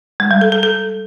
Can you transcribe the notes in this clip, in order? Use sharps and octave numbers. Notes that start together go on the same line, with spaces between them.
G#3
G3
A4
A4
A4